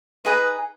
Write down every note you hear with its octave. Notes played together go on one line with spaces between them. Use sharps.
D#4 G#4 B4 D#5 A#5